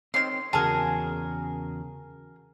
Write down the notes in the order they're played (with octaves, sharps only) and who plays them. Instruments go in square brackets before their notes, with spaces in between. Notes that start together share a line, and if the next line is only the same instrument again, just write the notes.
[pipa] D#3 G#3 C#4 [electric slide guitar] C4 [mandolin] C6
[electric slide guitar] E2 C#3 F#4 [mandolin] G#4 A#4 [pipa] A5